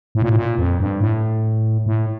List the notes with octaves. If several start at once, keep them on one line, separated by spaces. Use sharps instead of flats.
A2
A#2
A2
A#2
F2
G2
A2
A2